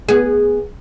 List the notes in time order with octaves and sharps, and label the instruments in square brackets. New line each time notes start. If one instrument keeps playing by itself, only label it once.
[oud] B3 G#4